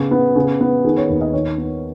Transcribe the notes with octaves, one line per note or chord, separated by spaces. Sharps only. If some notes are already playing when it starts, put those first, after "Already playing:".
Already playing: C#3 B3
B3
C#3
B3
D#3 G#4
C#5
D#2
D#5
D#3 C#5
B3